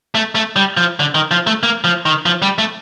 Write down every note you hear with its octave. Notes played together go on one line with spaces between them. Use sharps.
A3
A3
G3
F3
D3
D#3
F3
A3
A#3
F3
D#3
F3
G3
A3